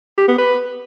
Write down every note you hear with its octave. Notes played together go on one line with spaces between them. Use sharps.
G4
B3
B4